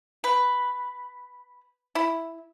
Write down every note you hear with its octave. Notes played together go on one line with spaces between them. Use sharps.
B4
E4